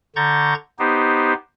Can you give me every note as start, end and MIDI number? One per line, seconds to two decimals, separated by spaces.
0.16 0.54 50
0.16 0.54 82
0.16 0.54 85
0.16 0.54 91
0.16 0.54 93
0.79 1.34 59
0.79 1.34 63
0.79 1.34 67
0.79 1.34 72